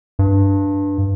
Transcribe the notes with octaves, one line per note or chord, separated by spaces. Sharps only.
G2